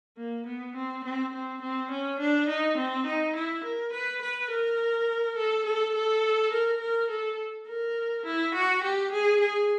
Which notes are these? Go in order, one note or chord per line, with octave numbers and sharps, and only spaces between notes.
A#3
B3
C4
C4
C4
C4
C#4
D4
D#4
C4
D#4
E4
A#4
B4
B4
A#4
A4
A4
A4
A#4
A#4
A4
A#4
E4
F#4
G4
G#4
G#4